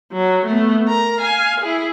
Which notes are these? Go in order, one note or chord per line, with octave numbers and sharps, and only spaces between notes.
F#3
A3 B3
A#4 A#5
F5 G#5
E4 G#4